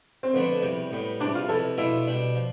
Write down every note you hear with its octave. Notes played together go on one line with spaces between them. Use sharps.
C4
F2 D3 F3 A3 B3 D4
E2 C3 G3
A2 G3 B3
E2 C3 G3 D4
F4
F2 C3 E3 A4
B2 A3 D4 E4 F4
B2 G3 D4
F3